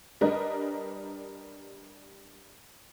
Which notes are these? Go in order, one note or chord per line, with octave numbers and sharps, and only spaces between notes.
G3 D4 A#4 B4 D#5